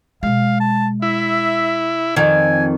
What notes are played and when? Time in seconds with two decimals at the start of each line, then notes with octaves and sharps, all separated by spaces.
0.23 B2 G#3 F5
0.60 A5
1.02 E4 E5
2.16 F2 D#3 G#5